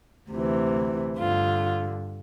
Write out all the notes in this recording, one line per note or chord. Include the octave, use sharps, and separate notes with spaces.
D2 C3 E3
G2 D3 F4